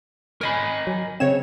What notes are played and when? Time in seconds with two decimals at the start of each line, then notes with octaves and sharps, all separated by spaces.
0.41 A#4 D#5 G#5 B5
0.87 F#3
1.20 C#3 C4 C#5 E7